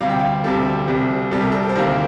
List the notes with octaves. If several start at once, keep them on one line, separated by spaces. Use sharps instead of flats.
D2 C3 G3 F5
G5
F5
D2 C3 G3 A4
C2 C3 G3
C2 C3 G3 A4
A#4
A4
C5
D2 C3 D#3 A#3 A#4